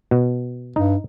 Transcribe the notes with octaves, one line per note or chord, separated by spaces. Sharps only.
B2
G2 D#4